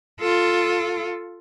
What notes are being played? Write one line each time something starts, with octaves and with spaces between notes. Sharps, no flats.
F4 A4